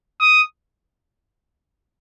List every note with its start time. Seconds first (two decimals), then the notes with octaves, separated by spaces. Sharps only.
0.20 D#6